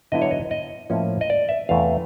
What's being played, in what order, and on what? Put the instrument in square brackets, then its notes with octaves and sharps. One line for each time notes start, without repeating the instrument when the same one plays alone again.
[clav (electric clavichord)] D3 F#3 B3 E4 D#5
C#5
D#5
D#5
A2 F3 A#3 C#4
D#5
D5
E5
E2 C3 E3 A3 F5